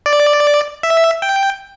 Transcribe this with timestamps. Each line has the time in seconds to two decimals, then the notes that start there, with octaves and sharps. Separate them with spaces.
0.06 D5
0.83 E5
1.22 G5